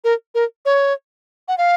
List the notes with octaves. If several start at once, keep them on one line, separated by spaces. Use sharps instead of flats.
A#4
A#4
C#5
F#5
F5